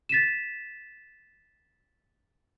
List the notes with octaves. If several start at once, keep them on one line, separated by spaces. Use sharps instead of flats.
A6 B6 D#7 E7